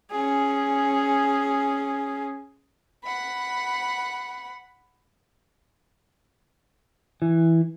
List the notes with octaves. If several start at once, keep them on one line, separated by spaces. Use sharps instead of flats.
C#4 G#4
F#5 B5
E3